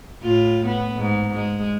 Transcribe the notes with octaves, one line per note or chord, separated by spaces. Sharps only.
A2 F4
B3
G#2
G#3